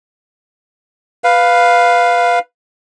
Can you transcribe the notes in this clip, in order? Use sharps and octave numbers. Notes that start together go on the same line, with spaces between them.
B4 F5